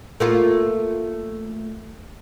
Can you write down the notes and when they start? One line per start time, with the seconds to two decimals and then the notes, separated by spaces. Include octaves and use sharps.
0.20 A3 A#3 F4